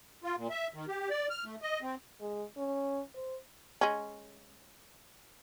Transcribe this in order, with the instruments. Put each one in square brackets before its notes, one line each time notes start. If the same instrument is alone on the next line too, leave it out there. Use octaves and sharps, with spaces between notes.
[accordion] F4
A#2
E5
D#3
G4
D5
F6
A3
D#5
C4
[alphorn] G#3
C#4
C5
[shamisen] G#3 C#4